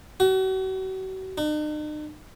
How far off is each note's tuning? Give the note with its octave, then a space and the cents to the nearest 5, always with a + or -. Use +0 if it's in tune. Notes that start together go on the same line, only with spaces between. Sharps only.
F#4 +40
D#4 -45